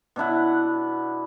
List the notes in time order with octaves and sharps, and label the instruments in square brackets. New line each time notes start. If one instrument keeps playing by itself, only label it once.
[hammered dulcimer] B2 D4 E4 F#5